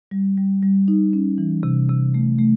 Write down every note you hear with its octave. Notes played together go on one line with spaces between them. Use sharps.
G3
G3
G3
D#4
C#4
E3
C3
C3
A3
A3